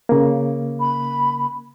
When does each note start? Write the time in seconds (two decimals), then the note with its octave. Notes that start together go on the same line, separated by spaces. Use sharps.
0.09 C#3 A#3
0.80 B5